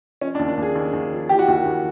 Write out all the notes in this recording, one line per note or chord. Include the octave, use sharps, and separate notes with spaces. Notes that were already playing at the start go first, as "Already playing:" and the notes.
F3 C#4
D4
D#2
D4
D#2 G#4
D#2
D#2
F3
E3 G4
F#4
D#2 G4
D#2